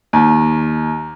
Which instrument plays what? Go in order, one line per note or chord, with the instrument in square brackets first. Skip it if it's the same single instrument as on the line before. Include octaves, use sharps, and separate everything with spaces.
[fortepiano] D#2